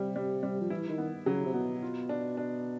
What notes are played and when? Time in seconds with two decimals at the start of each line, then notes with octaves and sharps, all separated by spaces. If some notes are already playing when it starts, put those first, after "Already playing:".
Already playing: C3 G3
0.16 G3
0.43 G3
0.61 F3
0.70 E3 E4
0.89 D#3
0.98 B3
1.26 C#3 F#3
1.46 C3
1.54 B2 B3
1.83 F4
2.09 D4
2.37 D4